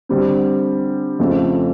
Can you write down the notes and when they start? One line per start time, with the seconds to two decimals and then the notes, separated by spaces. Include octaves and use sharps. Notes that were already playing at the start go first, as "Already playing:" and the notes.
0.09 D3 G3 C4
1.19 F2 C#3 F3 A3 C4